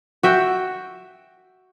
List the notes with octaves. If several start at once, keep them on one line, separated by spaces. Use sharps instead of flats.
F#4 E5 G5